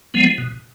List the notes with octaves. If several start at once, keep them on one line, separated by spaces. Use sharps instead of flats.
F3 G#3 B3
B2